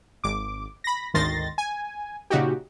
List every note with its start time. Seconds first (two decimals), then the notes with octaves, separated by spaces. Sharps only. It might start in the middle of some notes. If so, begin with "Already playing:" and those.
0.24 G#1 D6
0.84 B5 A#6
1.14 G#1 D2 D#3 C6 A6 A#6
1.58 G#5
2.30 A#2 C#3 D#4 F#4 G4